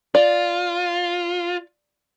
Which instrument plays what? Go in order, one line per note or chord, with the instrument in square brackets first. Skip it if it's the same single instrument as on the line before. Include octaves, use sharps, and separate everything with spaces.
[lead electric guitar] F4 [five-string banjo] D5